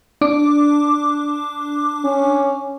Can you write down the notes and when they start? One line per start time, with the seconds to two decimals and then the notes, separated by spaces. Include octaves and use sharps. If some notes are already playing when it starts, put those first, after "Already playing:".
0.21 D4 D6
2.04 C#4